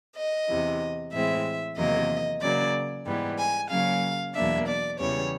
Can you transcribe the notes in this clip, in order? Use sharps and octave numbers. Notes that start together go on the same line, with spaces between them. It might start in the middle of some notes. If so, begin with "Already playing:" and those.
D#5
E2 C3 E3
A2 E3 G#3 C4 E5
E2 C3 D#3 F#3 A#3 D#5
C#3 F#3 A#3 D5
G#2 E3 G3 B3
G#5
C#3 F#3 A#3 C#4 F5
E2 B2 F#3 A#3 D4 E5
D5
E2 C#3 E3 G3 B3 C#5